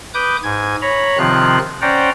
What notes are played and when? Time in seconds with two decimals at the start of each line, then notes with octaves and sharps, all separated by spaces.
0.14 B4 D6 D#6 G6
0.43 G#2 G#5 G#6
0.81 C#5 A#5 B5
1.18 C3 D#3 F3 C4 F4 F#6
1.81 C#4 C5 D5 F#5 G5 A#5